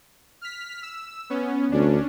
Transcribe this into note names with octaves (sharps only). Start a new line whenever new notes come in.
F6 B6
E6
B3 C#4
D2 C#4 D4